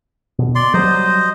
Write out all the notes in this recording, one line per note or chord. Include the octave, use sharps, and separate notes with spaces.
B2
D5 C6
F#3 G3 C5 D#5